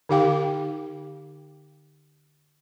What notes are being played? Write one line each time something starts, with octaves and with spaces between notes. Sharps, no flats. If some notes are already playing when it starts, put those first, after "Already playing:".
D3 D#4 G4 F5 G5 D6